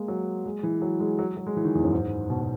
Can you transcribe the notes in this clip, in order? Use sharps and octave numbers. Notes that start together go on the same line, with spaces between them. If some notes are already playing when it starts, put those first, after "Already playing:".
Already playing: G#3 A#3
F#3
G#3
E3
F#3
G#3
F#3
F#3
G#3
E3
D#3
E2
F#2
G#2
B2
B2